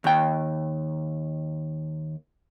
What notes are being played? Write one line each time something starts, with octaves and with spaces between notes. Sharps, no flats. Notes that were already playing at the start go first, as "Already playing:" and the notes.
D#2 G5